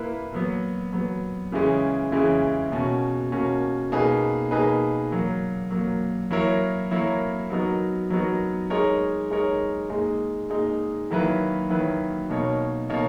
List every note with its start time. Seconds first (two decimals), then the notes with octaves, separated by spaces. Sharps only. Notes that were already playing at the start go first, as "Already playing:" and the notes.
Already playing: A#2 A#3 E4 B4
0.32 A#2 F#3 B3
0.93 A#2 F#3 B3
1.52 C#3 E3 G#3 C#4
2.12 C#3 E3 G#3 C#4
2.72 B2 A#3 C#4 F#4
3.32 B2 A#3 C#4 F#4
3.92 B2 A#3 D#4 G#4 B4
4.51 B2 A#3 D#4 G#4 B4
5.11 A#2 F#3 A#3
5.71 A#2 F#3 A#3
6.31 F#3 A#3 E4 A#4 C#5
6.91 F#3 A#3 E4 A#4 C#5
7.50 F#3 B3 D#4 F#4 A#4
8.10 F#3 B3 D#4 F#4 A#4
8.70 G#3 D#4 A#4 C#5
9.30 G#3 D#4 A#4 C#5
9.90 A#2 G#3 D#4
10.50 A#2 G#3 D#4
11.11 D#3 F#3 A#3 E4 B4
11.70 D#3 F#3 A#3 E4 B4
12.30 B2 A#3 D#4 A#4 C#5
12.90 B2 A#3 D#4 A#4 C#5